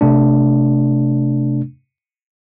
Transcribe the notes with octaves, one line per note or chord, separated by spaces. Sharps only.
C3 A3 D4